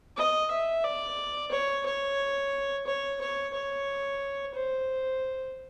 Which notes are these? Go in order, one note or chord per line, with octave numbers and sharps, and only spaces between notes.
D#5
E5
D5
C#5
C#5
C#5
C#5
C#5
C5